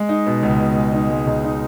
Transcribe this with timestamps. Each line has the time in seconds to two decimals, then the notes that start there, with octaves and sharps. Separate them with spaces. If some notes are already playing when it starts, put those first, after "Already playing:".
Already playing: G#3
0.09 D#4
0.26 B2
0.43 C#2
0.60 B2
0.76 G#3
0.93 D#4
1.10 G#3
1.27 C#2
1.44 D#4